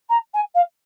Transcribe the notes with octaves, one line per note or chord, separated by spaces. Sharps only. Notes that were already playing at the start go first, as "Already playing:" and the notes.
A#5
G#5
F5